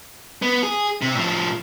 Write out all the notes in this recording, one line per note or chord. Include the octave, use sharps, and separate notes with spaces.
B3
G#4
C3
A2 F3